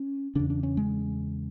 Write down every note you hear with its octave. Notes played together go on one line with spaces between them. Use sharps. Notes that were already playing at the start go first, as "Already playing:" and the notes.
Already playing: C#4
E2 C#3 D4
D4
C#4
G#3